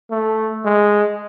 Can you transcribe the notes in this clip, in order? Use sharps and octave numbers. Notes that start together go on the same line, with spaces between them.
A3
G#3